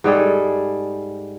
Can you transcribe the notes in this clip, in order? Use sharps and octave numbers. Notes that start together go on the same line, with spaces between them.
G#2 G3 G#4 A4